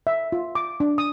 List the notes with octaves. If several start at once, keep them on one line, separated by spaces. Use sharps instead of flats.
E5
F4
D6
D4
D#6